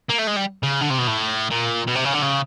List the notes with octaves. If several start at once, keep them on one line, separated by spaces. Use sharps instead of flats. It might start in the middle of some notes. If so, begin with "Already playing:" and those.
A#3
A3
G#3
G3
C#3
D3
C3
B2
A2
A#2
B2
C3
C#3
D3
C#3